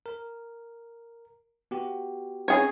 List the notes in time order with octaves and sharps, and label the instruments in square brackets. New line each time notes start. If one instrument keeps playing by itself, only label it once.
[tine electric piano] A#4
B3 F#4 G4
[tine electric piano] C4 C#4 [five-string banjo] G#4 C#5